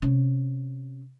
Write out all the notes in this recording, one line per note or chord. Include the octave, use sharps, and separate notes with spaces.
C3 C#4